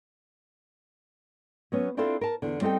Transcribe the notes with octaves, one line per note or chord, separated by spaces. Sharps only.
F#3 B3 C#4
C4 D4 E4 F4 A4 C5
A#4 A5
E2 D3
G3 C4 D#4 A4 G5